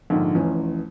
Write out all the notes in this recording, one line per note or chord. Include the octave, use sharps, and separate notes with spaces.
A#1 G#2 D3
F1 E2 C#4